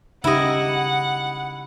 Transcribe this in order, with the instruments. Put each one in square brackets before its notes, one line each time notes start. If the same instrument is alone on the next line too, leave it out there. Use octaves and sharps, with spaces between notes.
[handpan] C#3 D#4 G4 [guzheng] E4 D#5 [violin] F#5